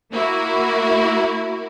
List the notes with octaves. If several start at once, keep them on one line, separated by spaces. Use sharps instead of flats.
A#3 E4 F#4 A#4